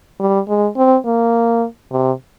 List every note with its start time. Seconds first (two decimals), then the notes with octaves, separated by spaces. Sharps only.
0.20 G3
0.49 G#3
0.77 C4
1.05 A#3
1.92 C3